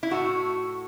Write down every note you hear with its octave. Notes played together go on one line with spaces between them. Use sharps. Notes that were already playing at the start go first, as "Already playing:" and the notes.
E4
A2 E3 A3 F#4